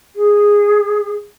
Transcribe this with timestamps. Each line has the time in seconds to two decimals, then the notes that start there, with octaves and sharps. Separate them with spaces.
0.15 G#4